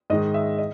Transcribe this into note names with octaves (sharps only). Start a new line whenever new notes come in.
G#2 D#3 D#5
E5
D#5